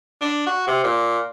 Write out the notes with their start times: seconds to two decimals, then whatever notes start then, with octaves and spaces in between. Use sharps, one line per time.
0.21 D4
0.47 F#4
0.67 C3
0.84 A#2